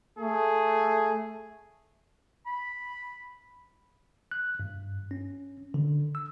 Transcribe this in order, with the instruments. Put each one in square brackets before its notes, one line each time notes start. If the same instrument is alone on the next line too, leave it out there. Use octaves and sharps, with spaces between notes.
[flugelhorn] A3 [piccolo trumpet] G#4
[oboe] B5
[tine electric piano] F#6
G2
C#4
D3
E6